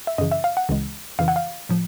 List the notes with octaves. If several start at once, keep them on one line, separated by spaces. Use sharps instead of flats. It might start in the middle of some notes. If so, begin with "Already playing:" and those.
E5
F#2 C#3 E3 D#5
E5
F5
F#5
C#2 C#3 E3 G#3
F2 C#3 E3 F5
F#5
F5
A2 F3